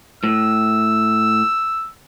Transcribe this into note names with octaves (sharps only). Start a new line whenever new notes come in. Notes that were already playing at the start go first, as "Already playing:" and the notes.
A2 E6